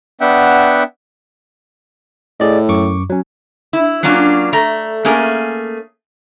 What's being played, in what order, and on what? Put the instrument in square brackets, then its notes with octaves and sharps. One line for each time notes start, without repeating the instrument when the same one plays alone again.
[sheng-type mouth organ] B3 D4 E5 F#5 G5
[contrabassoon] A2 [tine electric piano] G#4 D5 D#5
[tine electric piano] F#2 C#6 D6
F#3 C#4
[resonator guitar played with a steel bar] E4
F#3 A#3 C#4 D4 F4
A3 A#5
A3 A#3 C#4 G#4 A#4